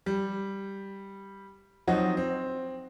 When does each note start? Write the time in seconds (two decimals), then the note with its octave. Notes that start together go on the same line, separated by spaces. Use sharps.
0.06 G3
1.87 F3 F#3 C4 D#4 F#4
2.17 C4